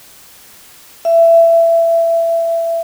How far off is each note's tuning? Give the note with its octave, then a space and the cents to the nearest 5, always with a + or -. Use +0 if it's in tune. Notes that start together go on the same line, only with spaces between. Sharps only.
E5 +20